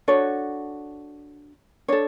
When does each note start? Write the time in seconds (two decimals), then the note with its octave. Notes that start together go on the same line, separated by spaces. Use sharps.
0.08 D4 F#4 A4 C#5
1.88 D4 A4 C#5